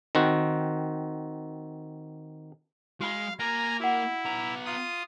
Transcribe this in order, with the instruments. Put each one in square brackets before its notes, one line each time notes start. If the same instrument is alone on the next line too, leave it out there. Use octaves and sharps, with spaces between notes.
[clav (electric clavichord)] D#3 C4 F#4
[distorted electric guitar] G#3 [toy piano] F#4 B5 [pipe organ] F5
[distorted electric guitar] A#3 [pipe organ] G#5 A#5
[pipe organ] E4 [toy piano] F#4 F#5
[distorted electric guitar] B3 A#5
[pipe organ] F4 D#6